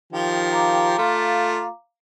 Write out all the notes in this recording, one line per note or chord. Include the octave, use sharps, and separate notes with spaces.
D#3 F3 G4
F5 A#5 D6
A3 F4